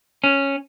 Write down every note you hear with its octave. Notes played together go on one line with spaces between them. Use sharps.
C#4